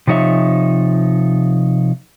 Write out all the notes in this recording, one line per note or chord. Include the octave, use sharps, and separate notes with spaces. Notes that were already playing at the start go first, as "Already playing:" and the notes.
C3 F3 D#4 C#5 E5